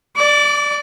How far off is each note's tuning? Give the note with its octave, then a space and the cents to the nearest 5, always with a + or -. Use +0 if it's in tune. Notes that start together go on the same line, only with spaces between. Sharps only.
D5 +5 D6 -30